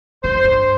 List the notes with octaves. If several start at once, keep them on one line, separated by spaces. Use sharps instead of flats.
G2 C5
F2
G2